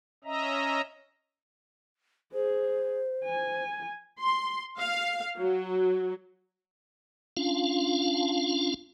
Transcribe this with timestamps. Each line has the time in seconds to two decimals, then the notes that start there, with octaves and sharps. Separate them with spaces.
0.24 C#4 D#5 E5 A#5
2.34 G#4 C5
3.25 G#5
4.21 C6
4.80 F5
5.38 F#3
7.37 C#4 D4 F4 F5